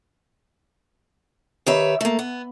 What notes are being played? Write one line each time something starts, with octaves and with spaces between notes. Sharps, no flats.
D#3 G4 B4 C#5 E5
A3 A#3
B3